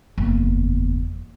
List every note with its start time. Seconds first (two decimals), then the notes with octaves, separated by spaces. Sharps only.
0.18 F#1 E2